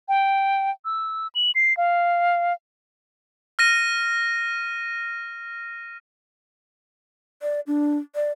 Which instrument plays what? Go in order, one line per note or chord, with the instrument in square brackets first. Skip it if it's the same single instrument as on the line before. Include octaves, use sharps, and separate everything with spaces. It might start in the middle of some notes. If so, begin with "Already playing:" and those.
[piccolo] G5
E6
F#7
C7
F5
[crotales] F6 A#6 D#7
[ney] D5
D4
D5